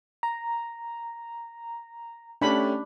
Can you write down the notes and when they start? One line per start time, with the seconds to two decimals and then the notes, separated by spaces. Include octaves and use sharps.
0.23 A#5
2.41 A3 C#4 D4 G4 B5